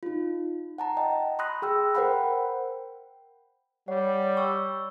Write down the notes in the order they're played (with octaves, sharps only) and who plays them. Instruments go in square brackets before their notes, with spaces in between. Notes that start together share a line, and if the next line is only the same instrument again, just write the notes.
[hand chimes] D#4 F4
F#5 A5 A#5
D#5 G5
B5 C6 D#6 F#6 A#6
G#4 G5 E6 F6
A#4 C5 F#5 G5 B5
[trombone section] G3 [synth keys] C#5 [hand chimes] F#5
[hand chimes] C#6 E6